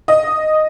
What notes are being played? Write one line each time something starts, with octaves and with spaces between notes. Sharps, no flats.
D#5